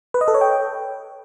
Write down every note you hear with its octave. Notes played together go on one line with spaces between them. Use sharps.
B4
D#5
A4
C#5
G5